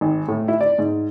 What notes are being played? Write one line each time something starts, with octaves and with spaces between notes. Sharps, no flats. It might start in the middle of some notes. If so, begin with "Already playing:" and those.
G#1
A2
E4
D5
G#2